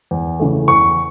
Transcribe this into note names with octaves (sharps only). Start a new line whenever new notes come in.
E2
C#3 E3 A3
E2 C#6